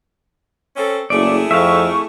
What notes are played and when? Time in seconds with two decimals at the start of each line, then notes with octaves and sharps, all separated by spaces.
0.77 C4 C#4 A4
1.10 F#1 A3 E4 G#4 D5
1.51 F2 E5 F5 C#6